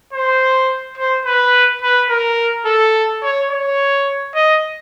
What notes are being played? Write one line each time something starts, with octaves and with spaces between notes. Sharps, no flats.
C5
C5
B4
B4
A#4
A4
C#5
C#5
D#5